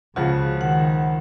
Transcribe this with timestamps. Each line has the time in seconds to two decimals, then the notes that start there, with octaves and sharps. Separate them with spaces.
0.16 C#2 C#3 F3 F4 F#4
0.61 D#3 F#5